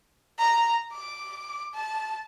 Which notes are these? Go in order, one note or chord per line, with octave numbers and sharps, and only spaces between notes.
A#5
D6
A5